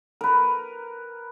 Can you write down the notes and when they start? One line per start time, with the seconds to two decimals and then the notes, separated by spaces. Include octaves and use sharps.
0.21 A#4 B4